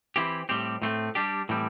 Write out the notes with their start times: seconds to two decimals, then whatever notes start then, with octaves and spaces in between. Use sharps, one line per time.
0.16 E3 C4 E4 G4
0.49 A2 G3 C4 G4
0.82 A2 A3 C4
1.15 G3 D4 G4
1.49 A2 E3 G3 C4